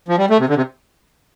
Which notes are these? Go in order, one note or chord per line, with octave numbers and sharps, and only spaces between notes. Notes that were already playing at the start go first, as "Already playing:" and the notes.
F3
G3
A3
C3
D3
C3